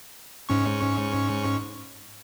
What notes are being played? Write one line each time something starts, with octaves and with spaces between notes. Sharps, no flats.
G#2 C#4 C#6